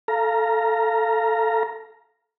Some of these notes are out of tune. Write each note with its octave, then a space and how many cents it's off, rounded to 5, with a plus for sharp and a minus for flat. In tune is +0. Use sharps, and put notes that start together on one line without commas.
A4 +0 F5 -15 A#5 +0